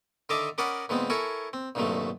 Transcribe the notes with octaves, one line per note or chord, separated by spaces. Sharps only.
D3 D#3 D#5 E5 A5 D6
C#4 A#4 D5 D#5 F#5 B5
A#2 D#3 G#3 B3 C4
E4 A4 A#4 C#5 G#5
C4
C2 G2 A#2 D#3 F#3 A3